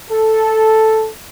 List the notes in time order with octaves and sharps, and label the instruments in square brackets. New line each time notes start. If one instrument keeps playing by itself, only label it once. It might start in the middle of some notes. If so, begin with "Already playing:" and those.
[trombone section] A4